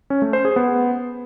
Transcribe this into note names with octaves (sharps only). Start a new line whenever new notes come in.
C#4
A3
C5
G#4
B3